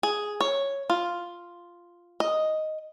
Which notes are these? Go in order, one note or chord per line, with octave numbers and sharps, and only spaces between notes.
G#4
C#5
F4
D#5